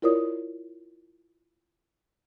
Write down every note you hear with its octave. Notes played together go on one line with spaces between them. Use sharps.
E4 F4 A#4 C#5 D5 D#6